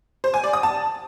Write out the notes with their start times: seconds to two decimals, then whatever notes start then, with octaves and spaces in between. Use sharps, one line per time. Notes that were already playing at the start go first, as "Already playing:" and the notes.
0.24 C5
0.34 G#5
0.44 D5
0.53 D#6
0.63 A5